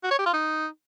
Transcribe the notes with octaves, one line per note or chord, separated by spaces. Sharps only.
F#4
C#5
G4
F4
D#4